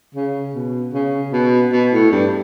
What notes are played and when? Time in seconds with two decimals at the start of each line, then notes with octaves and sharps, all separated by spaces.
0.15 C#3
0.55 B2
0.94 C#3
1.33 B2
1.73 B2
1.93 A2
2.12 G2